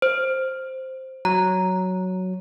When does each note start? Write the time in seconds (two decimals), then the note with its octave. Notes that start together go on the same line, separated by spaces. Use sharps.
0.02 C5
1.25 F#3 A#5